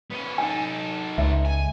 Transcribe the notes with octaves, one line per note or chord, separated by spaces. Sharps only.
B3 C#4
D#4 A4 G#5
C#2 E5
G#5